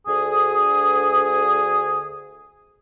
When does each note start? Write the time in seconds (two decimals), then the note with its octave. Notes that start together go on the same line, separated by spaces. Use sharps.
0.07 D2 G#4 D#6